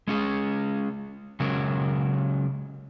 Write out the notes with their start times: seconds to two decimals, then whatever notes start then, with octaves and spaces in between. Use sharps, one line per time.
0.08 G#3 C#4 G#4
1.40 C#3 F#3 G#3 C#4 A#4